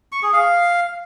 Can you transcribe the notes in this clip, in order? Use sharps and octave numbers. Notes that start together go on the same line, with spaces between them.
C#6
G#4
F5